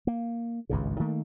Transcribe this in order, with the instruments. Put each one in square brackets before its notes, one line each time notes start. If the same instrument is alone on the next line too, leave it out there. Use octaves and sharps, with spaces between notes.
[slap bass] A#3
G#1 C#2 G2 C#3
D#3 A3 A#3